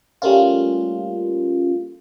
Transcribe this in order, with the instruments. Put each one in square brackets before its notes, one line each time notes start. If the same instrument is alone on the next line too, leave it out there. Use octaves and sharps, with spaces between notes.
[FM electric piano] G3 A3 A#3 C#4 F4